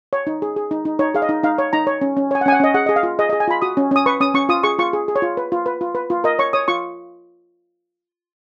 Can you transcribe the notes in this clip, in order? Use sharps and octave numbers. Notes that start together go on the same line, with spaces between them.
C#5
D#4
G#4
G#4
D#4
D#4
D#4 C#5
G#4 F5
D#5
D#4
D#4 F5
C#5
D#4 A#5
C#5
C#4
C#4
C#5 G#5
F#5
C#4 G#5
F#5
C#4 D#5
G#4 F#5
G#4 D#5
F5
F4
G#4 D#5
D#5
G#4
G#5
F4 B5
F#4 D#6
C#4
C#4 D#6
B4 C#6
C#4 D#6
C#4 C#6
F4 D#6
G#4 C#6
F4 C#6
G#4
G#4
C#5
F4
B4
F4
B4
F4
B4
F4
A#4 D#5
C#5 C#6
C#5 D#6
F4 C#6